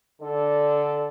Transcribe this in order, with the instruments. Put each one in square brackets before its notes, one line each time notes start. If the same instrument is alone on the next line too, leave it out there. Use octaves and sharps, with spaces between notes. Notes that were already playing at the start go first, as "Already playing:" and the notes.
[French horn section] D3 A4 D5